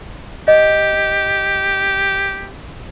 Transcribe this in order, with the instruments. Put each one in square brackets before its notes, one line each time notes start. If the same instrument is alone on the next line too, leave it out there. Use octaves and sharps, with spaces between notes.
[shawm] G4 [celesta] D#5